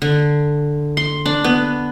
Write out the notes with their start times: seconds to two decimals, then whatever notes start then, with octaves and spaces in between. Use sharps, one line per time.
0.02 D3
0.97 C6
1.26 D4
1.44 B3